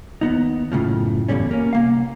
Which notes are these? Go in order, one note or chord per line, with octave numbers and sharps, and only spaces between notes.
D#2 G#2 B3 D#4
F#2 A2 C#3 F3
E2 G2 B2 D3 G3 C#4
A#3 C#4
C2 A#3 F5